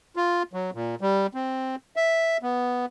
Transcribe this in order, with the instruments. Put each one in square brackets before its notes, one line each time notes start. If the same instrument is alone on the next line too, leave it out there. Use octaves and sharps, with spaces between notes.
[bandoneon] F4
F#3
A#2
G3
C4
E5
B3